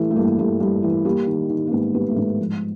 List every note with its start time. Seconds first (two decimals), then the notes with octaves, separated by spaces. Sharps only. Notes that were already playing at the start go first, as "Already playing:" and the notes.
Already playing: E3 G3 A3
0.11 A3
0.16 G2 A#3
0.38 G2 A3
0.60 G2
0.83 E3
1.05 G3 A#3
1.27 D#3
1.50 D#3
1.67 A#3
1.72 G#2 B3
1.94 G3 B3
2.10 A3
2.16 G#2 A#3
2.39 F3